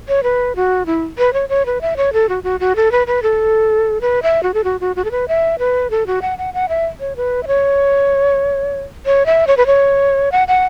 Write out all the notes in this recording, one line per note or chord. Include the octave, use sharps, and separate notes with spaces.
C#5
B4
F#4
E4
B4
C#5
C#5
B4
E5
C#5
A4
F#4
F#4
F#4
A4
B4
B4
A4
B4
E5
F#4
A4
F#4
F#4
F#4
A4
B4
E5
B4
A4
F#4
F#5
F#5
F#5
E5
C#5
B4
E5
C#5
C#5
E5
C#5
B4
C#5
F#5
F#5